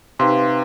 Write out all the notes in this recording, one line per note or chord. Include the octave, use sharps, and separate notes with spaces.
C3 D#4 B4 F5 C6